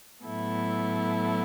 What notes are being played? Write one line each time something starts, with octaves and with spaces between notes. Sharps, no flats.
A2 F#3 B3 E4 A4